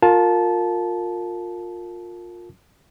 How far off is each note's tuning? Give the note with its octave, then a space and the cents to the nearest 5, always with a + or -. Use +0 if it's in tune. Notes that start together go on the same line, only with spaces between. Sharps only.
F4 +20 A#4 -20 A5 -15